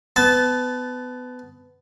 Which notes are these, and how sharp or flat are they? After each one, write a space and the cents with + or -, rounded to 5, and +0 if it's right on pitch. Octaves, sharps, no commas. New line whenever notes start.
B3 +20 A5 -15